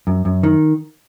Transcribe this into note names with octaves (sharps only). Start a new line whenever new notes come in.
F#2
F#2
D#3